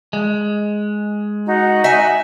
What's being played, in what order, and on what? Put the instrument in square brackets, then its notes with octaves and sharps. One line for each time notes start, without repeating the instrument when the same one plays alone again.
[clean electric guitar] G#3
[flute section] D#4 F#4
[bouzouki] E5 G#5